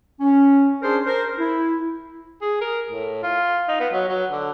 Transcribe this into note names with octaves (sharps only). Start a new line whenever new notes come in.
C#4
C#4 D4 G#4 A#4 C5 C6
A#4 C5
E4
G#4
A#4
A2
F4
D#4
B3
F#3
F#3
D3